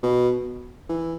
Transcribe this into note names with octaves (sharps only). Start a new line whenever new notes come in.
B2
E3